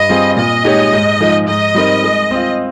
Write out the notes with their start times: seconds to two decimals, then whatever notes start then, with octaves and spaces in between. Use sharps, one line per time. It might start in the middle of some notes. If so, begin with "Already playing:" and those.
Already playing: G2 D#5
0.09 G3 C4 F4 G#4
0.36 A#2 D#5
0.65 G#3 D#4 G4 C#5
0.93 G#2
1.20 F3 G#3 D#4
1.47 G#2 D#5
1.75 G3 C4 D#4 A#4
2.03 G#3
2.31 C4 F4